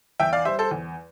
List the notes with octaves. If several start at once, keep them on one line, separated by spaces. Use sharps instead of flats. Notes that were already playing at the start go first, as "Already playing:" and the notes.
E2 E5 G5
D5 F5
G3 C5 E5
A4 C5
E2